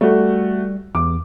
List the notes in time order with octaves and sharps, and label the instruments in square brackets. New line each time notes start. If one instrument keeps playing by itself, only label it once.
[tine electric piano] G3 [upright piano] A3 F#4
[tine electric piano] E2 [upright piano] D6